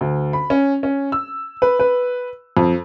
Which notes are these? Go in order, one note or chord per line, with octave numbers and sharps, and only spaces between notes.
D2
B5
C#4
C#4
E6
B4
B4
F2